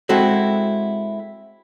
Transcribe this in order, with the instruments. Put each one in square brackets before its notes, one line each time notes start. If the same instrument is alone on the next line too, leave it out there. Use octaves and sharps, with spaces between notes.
[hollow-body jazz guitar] G#3 C4 E4 F#4 A4